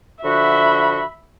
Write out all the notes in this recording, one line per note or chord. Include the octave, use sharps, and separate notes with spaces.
D3 F3 F#4 E5 B5